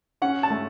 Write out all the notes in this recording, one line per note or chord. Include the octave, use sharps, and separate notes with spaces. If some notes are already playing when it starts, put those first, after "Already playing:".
C#4 F#5
A5
A3